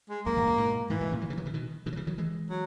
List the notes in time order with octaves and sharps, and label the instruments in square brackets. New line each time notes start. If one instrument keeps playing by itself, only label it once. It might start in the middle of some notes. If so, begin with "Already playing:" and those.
[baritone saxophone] G#3
[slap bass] F#2 [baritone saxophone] A#3
[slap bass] E2 G#2
F#2 A#2
G#2 B2
[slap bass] G#2 B2 [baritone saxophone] E3
[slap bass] G#2 B2
A#2 C#3
D#3 F#3
C#3 E3
D#3 F#3
C#3 E3
B2 D#3
B2 D#3
F#3
C#3 E3
D#3 F#3
E3 G#3
[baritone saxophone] F#3